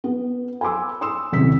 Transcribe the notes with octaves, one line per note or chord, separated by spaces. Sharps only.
B3
G#5 B5 C6 D6 E6
C6 D#6 E6 E7
D#1 C2 C3 C#4 E6 B6